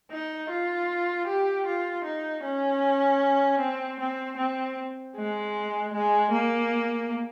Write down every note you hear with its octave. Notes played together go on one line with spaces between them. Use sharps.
D#4
F4
G4
F4
D#4
C#4
C4
C4
C4
G#3
G#3
A#3